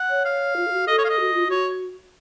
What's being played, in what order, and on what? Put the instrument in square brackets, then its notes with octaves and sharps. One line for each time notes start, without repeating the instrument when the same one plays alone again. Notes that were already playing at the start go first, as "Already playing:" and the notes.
Already playing: [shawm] F#5
[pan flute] C#5
[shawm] F5
[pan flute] F4
A4
F#4
[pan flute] A4 [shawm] D#5
[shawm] C#5
F5
D#5
[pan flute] F#4
F4
[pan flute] F#4 [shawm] C#5